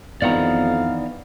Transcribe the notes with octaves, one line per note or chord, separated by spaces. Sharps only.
F2 D#3 E3 B3 D5 F5 F#5 A#5